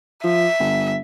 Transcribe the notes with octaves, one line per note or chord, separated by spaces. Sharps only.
F3 E5
G1